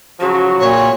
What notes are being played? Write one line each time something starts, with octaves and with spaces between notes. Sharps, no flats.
C#3 F3 F#3 F#4
A#2 C#5